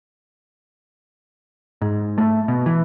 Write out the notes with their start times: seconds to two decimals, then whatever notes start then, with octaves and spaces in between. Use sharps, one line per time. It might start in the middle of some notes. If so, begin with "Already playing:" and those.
1.82 G#2
2.18 A3
2.48 B2
2.66 E3